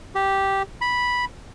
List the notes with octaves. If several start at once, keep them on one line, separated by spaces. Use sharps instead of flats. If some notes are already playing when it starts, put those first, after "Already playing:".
G4
B5